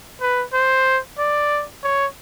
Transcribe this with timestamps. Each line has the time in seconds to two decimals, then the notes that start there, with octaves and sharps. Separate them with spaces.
0.21 B4
0.53 C5
1.18 D5
1.83 C#5